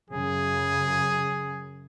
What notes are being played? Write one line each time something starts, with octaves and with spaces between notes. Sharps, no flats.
F#2 C#3 G#4